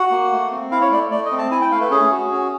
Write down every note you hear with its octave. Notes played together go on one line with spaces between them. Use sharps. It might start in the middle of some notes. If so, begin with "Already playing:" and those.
Already playing: F#4 F#5
A#3
A3
C4
E4 F5
C#5
A3 D5
A3 D5
D#5
C4
A5
E4 G#5
G5
A3 F5
B4
C#4 G#4
F#4
C#4